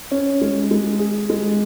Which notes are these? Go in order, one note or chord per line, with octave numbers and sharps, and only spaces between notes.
C#4
G#3
G#3
G#4
G#3